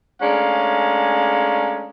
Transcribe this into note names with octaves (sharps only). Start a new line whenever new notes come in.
G#3 A3 C#4 D4 F5 A#5